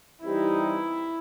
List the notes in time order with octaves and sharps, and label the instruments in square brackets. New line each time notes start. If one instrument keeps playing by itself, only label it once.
[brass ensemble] E3 G3 C4 D#4 G4 [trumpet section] E4